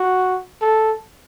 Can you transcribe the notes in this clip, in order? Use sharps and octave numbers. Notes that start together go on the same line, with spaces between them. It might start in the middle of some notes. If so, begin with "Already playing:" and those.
Already playing: F#4
A4